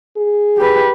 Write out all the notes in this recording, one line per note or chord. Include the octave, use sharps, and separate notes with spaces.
G#4
G4 B4